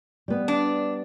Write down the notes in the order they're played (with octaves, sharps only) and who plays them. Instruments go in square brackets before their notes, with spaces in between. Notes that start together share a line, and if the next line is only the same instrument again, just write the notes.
[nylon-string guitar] G3 B3
[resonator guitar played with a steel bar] D4